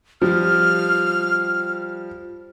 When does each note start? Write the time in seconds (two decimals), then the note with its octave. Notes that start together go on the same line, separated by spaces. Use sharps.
0.22 F3 G3 F6